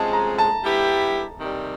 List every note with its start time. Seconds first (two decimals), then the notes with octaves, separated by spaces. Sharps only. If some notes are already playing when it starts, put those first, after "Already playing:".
Already playing: C3 F3 G#3 C#4 A5
0.13 A#5
0.38 A5
0.63 G3 B3 E4 G4
1.39 C3 D#3 G3